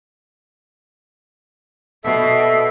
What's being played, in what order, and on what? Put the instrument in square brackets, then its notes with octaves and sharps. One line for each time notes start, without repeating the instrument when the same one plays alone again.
[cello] B2 [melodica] A4 E5